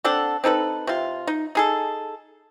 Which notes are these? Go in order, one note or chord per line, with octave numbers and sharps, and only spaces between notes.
C4 D4 A4 F#5
C4 D#4 A4 B4
C3 F4
D#4
D#4 G#4 A4